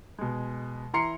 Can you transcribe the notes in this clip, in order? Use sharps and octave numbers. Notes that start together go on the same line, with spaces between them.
B2 G#3
E3 E4 A#5 C6 C7 C#7